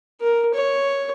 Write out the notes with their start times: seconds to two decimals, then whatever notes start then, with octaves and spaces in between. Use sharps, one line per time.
0.21 A#4
0.54 C#5